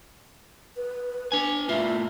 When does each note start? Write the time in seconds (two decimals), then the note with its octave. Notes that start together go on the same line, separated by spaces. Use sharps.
0.77 B4
1.32 D4 G#5
1.69 A2 F4 E5